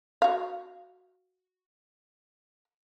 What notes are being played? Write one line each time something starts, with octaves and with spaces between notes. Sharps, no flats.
F#4 F5